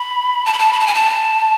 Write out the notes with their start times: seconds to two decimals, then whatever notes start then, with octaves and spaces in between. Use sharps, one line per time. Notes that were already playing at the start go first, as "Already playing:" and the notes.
Already playing: B5
0.46 A5
0.53 B5
0.59 A5
0.73 B5
0.80 A5
0.87 G#5
0.95 A5